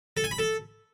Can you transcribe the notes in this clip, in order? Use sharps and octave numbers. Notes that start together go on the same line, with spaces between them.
A4
G#5
B5
A4